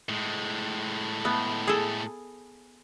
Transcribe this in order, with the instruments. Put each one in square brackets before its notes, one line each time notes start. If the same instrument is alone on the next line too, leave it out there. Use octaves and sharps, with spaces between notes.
[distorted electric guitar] A2 G#3
[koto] A3 B3
G#4 A4